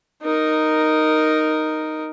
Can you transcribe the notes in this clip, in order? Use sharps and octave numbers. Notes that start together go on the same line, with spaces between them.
D#4 A#4